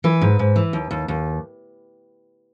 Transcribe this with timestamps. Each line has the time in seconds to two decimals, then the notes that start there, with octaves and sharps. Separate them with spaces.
0.04 E3 B4
0.21 G#2
0.39 G#2
0.56 E3
0.73 D#2
0.91 D#2
1.08 D#2